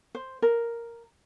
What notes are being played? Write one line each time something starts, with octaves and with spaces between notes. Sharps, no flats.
C5
A#4